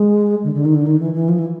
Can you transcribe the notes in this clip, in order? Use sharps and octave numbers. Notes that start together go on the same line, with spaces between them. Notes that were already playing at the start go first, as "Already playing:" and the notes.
Already playing: G#3
D3
D3
D#3
D3
D#3
E3
E3
F3
E3